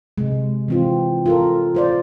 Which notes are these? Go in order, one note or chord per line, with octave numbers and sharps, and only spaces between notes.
C3 G#3
E3 C4 F4
F4 A4 A#4
F4 C5 D5